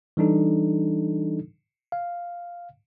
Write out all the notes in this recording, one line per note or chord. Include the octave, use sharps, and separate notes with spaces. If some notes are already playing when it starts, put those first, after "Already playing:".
E3 G3 D4 D#4 A4
F5